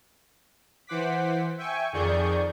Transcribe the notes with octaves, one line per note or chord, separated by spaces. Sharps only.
E3 C5 F#5 D6 B6
E5 G5 G#5 C#6
F2 D#3 G#4 D5 C#6 G6